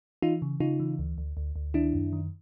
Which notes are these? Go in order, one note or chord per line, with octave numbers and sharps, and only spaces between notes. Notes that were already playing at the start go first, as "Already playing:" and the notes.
E3 D#4 F4
C#3
C#3 D#4 F4
E3
D2
D2
D2
D2
D#3 D4 E4
F#2
D#3